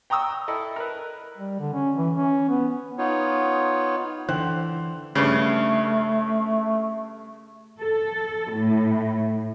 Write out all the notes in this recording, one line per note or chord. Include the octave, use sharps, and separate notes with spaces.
G5 A#5 C#6 D#6 E6
E4 A4 D#5
A#4 B4
G3
D3
C#4
E3
C#4
B3
B3 D#4 F4 C#5
D3 E3 C5 G5 F#6
G2 C#3 A3
A4
A2